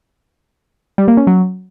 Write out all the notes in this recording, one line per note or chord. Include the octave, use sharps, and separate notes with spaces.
G3
A#3
C#4
F#3